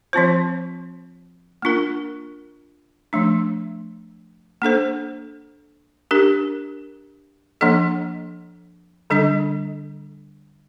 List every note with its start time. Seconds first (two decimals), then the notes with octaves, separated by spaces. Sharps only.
0.13 F3 C4 F4 C5
1.62 A#3 D4 F4 A#4
3.13 F3 A3 D4
4.62 A#3 D4 A4 C5
6.11 D4 G4 A#4
7.61 F3 A#3 D4 A4 D#5
9.10 D3 G3 D4 A4 D#5